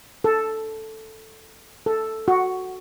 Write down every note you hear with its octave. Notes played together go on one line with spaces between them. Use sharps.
A4
A4
F#4